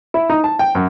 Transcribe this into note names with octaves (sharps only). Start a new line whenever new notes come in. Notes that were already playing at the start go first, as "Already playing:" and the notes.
E4
D#4
A5
G5
F#2